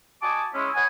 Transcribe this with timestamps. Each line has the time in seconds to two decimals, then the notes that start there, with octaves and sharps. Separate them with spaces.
0.21 F#4 D#5 G#5 A5 D6
0.53 G#3 C#4 E4
0.74 B4 C#5 D#5 F#5 G#5